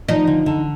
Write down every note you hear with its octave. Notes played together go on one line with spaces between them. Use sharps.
F3 D#4
D3
D3